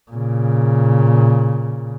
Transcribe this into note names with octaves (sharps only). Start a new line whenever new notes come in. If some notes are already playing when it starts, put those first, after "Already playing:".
A#2 C#3